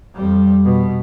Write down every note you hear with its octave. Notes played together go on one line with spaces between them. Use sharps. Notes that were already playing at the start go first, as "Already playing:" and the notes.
F2 G3
B2